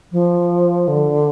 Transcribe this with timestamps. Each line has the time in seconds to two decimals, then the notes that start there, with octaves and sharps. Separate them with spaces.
0.12 F3
0.88 D3